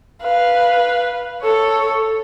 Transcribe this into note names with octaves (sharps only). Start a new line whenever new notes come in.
B4 F5
A4 C#5